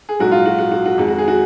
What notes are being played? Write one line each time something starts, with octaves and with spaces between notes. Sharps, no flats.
G#4
A#1 G#2 F#3 F#4
F4
F#4
F#4
F#4
F#4
F2 D#3 G#3 D#4
F#4
G#4
F#4